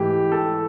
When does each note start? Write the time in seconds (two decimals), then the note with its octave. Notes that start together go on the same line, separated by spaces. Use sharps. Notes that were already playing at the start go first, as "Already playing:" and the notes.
Already playing: G#2 E3 A3 G4
0.32 A4